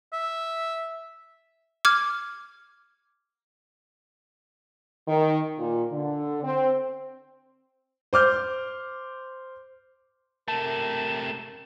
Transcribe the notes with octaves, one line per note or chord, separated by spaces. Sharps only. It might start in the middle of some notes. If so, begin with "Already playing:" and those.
E5
D6 F6 G#6
D#3
A#2
D3
C4
C5 D6 F6 G6
C3 A3 A#4 A5 E7